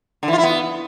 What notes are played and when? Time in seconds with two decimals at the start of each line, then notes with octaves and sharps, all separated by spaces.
0.23 D3
0.28 E3
0.33 F4
0.38 E4
0.43 B3